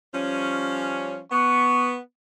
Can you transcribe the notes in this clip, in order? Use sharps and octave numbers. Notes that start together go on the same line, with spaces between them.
F3 G3 C#4
B3 C#6